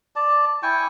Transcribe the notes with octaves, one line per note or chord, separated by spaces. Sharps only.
D5 A5
E4 G5 G#5 C#6